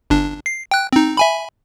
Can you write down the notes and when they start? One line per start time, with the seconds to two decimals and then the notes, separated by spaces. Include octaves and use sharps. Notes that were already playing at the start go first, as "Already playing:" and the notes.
0.10 G1 D4
0.46 C7
0.71 G5 F#6
0.93 C4 D#4
1.17 E5 G#5 B5